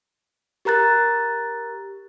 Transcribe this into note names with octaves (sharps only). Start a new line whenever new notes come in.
G4 A#4 A#5 F#6 A6